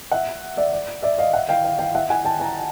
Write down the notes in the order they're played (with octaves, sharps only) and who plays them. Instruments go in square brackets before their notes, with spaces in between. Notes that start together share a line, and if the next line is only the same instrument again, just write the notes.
[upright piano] E5 F#5
D5 E5
D5
D5 E5
D#5 F5
E5 F#5
F5 G5
F5 G5
F5 G5
E5 F#5
F#5 G#5
G5 A5
G#5 A#5